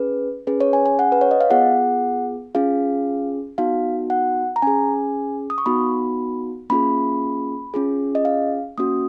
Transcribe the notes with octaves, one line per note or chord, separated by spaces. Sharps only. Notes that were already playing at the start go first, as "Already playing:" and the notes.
Already playing: C#4 G#4 B4
C#4 G#4 B4
C#5
G#5
G#5
F#5
B4
C#5
D#5
F5
B3 F4 G#4 F#5
C#4 F4 G#4 F5
B3 D#4 F#4 F5
F#5
A#5
C#4 G#4 G#5
D#6
C#6
B3 D#4 F#4 B5
A#3 C#4 F4 G#4 B5
C#4 F4 G#4
D#5
F5
A#3 C#4 F#4 D#6